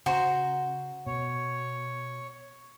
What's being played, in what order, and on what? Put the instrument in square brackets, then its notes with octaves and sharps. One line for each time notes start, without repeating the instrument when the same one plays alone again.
[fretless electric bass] C#3 [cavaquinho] F#4 C5 A#5
[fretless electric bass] B2 [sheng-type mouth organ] C#5